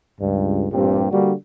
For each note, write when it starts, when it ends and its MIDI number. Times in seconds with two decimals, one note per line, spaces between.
0.20 0.67 37
0.20 0.67 43
0.72 1.08 33
0.72 1.08 43
0.72 1.08 46
0.72 1.08 60
0.72 1.08 67
1.11 1.33 50
1.11 1.33 55
1.11 1.33 58
1.11 1.33 62
1.11 1.33 66